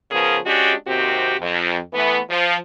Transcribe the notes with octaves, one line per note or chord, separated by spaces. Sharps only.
C#3 F3 B3 G#4 A#4
G#3 C#4 D4 F#4 G4
D#2 C3 C4 F#4 G4
F2
E3 A3 B3
F3